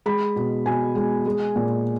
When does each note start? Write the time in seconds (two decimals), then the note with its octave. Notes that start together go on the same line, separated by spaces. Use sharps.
0.06 G#3 B5
0.36 B2
0.66 B2 G#5
0.95 G#3
1.26 G#3
1.56 A#2